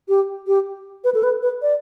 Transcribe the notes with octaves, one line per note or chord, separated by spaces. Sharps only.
G4
G4
B4
A4
B4
B4
D5